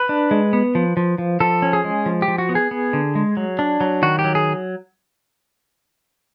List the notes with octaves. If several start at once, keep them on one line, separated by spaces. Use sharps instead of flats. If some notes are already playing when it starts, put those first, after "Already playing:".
Already playing: B4
D4
G#3
B3
F3
F3
F3
F3 A4
C#4
G#4
G#3
F3
G4
F3
F#4
B3
G#4
B3
D3
G#3
F#3
D4
F#3
D#3 F#4
G4
F#3
G#4